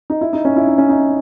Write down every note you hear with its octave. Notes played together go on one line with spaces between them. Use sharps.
D#4
E4
D#4
C#4
E4
D#4
C#4
D#4